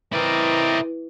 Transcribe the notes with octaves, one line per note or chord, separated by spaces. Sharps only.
E3 C4 E4 A#4 D5 D#5